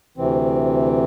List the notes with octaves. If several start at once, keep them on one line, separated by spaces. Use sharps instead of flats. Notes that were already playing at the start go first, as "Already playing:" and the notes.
D2 C3 E3 C4